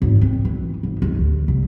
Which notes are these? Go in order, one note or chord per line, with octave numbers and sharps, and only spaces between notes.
G#1
C4
E3
G#1
D#2
D2
C2